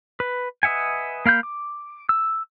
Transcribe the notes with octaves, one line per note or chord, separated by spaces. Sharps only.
B4
B4 D#5 E5 F#5 G#5
A#3 F5 B5 G6
D6
E6